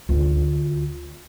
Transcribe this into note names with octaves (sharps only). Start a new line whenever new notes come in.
D2 F4